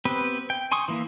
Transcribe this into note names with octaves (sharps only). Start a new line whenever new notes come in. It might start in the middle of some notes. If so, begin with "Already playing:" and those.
B3 C4 G4 B4
G5
G#5 C6 C#6 D#6
E3 A#3 E4